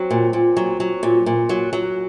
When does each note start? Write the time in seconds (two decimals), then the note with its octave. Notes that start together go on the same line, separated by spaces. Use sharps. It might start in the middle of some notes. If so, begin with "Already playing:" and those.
Already playing: F#3 C4
0.10 A#2
0.33 A#2
0.57 F#3
0.80 F#3
1.03 A#2
1.26 A#2
1.49 F#3
1.73 F#3